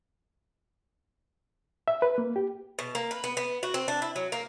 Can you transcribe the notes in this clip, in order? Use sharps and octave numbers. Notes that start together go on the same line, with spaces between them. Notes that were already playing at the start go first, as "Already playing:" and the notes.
E5
B4
A#3
G4
B2
A#3
B4
B3
B3
F#4
C4
D4
E4
F#3
A#3